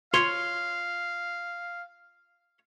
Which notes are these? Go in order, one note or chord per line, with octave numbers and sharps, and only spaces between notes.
F4 C#5 F5 C6